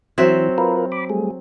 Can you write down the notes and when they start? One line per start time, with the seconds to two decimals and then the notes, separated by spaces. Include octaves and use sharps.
0.18 E3 F#3 C4 E5
0.58 F4 A#4 B4
0.92 B5 D6
1.09 G3 A3 G#4